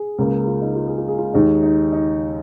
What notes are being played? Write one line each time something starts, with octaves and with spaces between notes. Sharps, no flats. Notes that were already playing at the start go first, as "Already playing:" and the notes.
Already playing: G#4
C#2 C#3 A#3
G#4
F4
D#4
F4
G#4
F4
G#4
F4
D#2 D#3 G#3 D#4
D#4
D#4